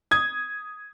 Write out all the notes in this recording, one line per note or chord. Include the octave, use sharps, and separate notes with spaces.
D#6 G#6